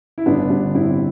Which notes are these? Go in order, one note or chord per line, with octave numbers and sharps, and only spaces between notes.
E4
G1 B3 D4
G1
G1 C4 E4